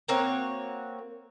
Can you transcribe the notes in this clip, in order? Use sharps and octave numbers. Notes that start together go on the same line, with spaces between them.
A#3 C4 F#4 C#5